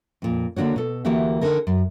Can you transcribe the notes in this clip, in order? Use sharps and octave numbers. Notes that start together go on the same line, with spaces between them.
F2 A#2
D3 A#3 D4 F#4 C#5
B2 A4
D2 E3 A#3 F#4 G4 E5
D3 D#4 G#4 A#4
F#2